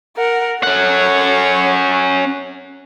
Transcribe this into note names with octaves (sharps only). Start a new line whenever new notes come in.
A#4 F#5
C#4 A4 C#5 F#5